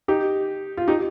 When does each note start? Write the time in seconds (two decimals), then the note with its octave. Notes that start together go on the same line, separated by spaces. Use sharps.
0.08 D#4 G4
0.77 F4
0.88 D#4 G4